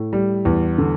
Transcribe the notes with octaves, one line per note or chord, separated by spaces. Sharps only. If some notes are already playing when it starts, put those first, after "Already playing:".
Already playing: A2
G3
E2
D3